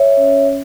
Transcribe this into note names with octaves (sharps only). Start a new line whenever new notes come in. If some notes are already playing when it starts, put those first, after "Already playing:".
Already playing: C#5 E5
C#4